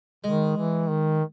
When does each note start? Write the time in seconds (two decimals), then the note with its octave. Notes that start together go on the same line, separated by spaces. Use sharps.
0.24 D#3 G#3
0.57 E3
0.89 D#3